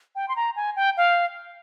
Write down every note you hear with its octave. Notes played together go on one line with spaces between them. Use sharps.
G5
C6
A#5
G#5
G5
F5